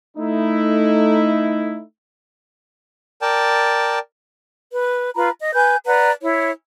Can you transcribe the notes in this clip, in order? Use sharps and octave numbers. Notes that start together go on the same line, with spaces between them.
A3 D#4 E4
A#4 D5 G5 A5
B4
F4 B4 A#5 B5
D#5
B4 G#5 G6
B4 D5 F#5 A#5
E4 C#5